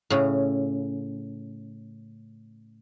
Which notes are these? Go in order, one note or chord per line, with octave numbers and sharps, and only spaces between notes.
A2 C#3